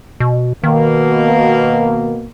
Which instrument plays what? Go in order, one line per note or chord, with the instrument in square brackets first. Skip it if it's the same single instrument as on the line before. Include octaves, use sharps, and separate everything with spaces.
[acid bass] B2
[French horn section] B2 A#3 [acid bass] D#3